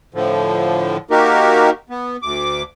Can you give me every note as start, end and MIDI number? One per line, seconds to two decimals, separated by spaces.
0.14 0.97 45
0.14 0.97 50
0.14 0.97 53
1.11 1.70 58
1.11 1.70 63
1.11 1.70 66
1.11 1.70 67
1.11 1.70 70
1.90 2.17 59
2.22 2.62 38
2.22 2.62 86